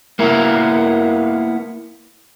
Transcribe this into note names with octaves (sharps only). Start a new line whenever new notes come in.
A#3 B3 E4 A#4